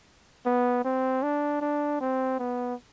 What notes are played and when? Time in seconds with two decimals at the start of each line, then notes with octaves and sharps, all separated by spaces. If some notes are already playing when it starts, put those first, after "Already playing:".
0.46 B3
0.84 C4
1.23 D4
1.61 D4
2.01 C4
2.39 B3